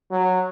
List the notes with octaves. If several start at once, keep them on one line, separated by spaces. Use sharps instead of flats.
F#3